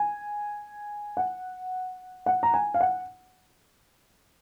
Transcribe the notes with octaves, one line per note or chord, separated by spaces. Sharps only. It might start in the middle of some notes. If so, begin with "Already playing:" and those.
Already playing: G#5
F#5
F#5
A#5
G#5
F5
F#5